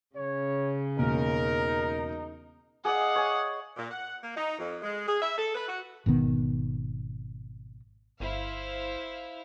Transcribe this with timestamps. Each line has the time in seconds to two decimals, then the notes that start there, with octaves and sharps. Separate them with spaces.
0.16 C#3 C#5
0.98 E1 A#3 D#4 A#4
2.85 G#4 D5 D#5 F5 F#5
3.16 C#5 G#5
3.76 A#2
3.91 F#5
4.22 A#3
4.36 D#4
4.58 F2
4.82 G#3
5.07 G#4
5.21 E5
5.38 A4
5.55 B4
5.68 F#4
6.06 G#1 B2 D#3 B3
8.20 G1 E4 C5 F5